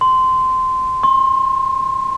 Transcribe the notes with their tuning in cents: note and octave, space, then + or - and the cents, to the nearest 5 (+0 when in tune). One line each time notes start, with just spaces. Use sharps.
C6 -15
C6 +35